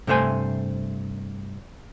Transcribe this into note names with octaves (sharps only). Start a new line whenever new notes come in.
G2 C3 A3 C5 G#5